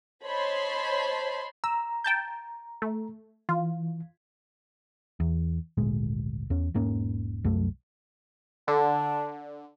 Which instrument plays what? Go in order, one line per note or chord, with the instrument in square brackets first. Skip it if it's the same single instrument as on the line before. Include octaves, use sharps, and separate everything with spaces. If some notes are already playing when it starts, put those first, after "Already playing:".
[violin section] C5 C#5 D#5 A5 B5 C6
[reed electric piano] A#5 [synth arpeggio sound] E6
[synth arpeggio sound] G5 A5 G6
A3
[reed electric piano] E3 [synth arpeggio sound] F4
[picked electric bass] E2
G#1 D2 A#2 G#3
E2 C#4
E1 G#2 A#3 C#4
C2 F#2 F#3 A3
[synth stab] D3 [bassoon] D4